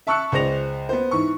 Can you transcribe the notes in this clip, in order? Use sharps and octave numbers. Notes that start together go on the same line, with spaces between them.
E5 A5 C#6 E6 F#6 C#7
C#2 G#4 C5 D5 A#6 F7
B3 C5
G#2 E3 C#6